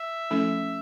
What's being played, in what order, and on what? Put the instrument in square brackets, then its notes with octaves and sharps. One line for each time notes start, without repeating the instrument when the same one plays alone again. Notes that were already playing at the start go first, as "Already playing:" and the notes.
Already playing: [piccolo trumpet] E5
[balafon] F3 A3 C#4 E4 A4